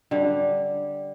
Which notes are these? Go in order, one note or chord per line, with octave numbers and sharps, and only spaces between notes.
D3 G3